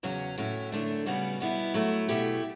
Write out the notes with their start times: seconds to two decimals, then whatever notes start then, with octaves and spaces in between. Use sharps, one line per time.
0.03 E2 C#3 F#3 C#4
0.38 A2 F#3 A3 C#4
0.72 F#2 D3 A3 D4
1.06 C#3 G3 B3 F#4
1.40 B2 G3 B3 E4
1.74 F#3 A3 E4
2.09 B2 A3 E4 G4